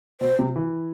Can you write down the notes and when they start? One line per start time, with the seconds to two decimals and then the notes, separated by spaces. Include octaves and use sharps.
0.21 B2 C5
0.39 C3
0.56 E3